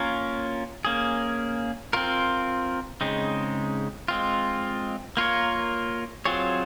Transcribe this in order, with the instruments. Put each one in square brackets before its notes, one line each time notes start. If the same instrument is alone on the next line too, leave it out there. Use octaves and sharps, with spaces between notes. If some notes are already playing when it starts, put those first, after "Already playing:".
Already playing: [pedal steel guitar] A#3 C#4 F4 A#4 C#5
A#3 C#4 G#4
C4 F4 A#4
C#3 G#3 C4 D#4
G#3 C4 F4
A#3 F4 A#4 C#5
F#3 C4 F4 G#4 C#5